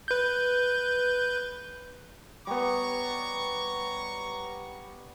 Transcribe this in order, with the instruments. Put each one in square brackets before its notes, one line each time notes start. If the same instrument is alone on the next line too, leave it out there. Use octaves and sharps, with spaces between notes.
[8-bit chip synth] B4 G6
[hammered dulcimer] G3 B3 [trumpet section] C#5 A#5 C#6